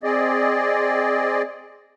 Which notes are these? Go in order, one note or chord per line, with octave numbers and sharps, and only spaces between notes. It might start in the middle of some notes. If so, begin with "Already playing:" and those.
C4 G#4 D5 D#5